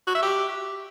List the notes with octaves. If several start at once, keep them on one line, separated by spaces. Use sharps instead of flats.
F#4
E5
G4